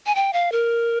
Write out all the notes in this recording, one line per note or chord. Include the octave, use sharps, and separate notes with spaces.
G#5
G5
F5
A#4